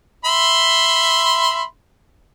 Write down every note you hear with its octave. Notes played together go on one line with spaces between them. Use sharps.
E5 B5 C6